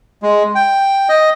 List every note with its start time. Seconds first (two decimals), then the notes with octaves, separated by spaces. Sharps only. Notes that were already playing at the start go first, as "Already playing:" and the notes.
0.23 G#3
0.55 G5
1.09 D#5